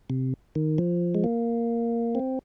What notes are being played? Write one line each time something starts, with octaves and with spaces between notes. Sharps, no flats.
C3
D#3
F3
G#3
A#3
C4